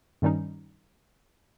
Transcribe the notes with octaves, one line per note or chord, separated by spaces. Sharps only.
G2 D#3 G3 C#4 D#4